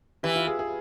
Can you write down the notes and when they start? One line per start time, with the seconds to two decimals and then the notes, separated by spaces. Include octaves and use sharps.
0.23 E3 G4
0.35 F4
0.47 G#4
0.59 G#4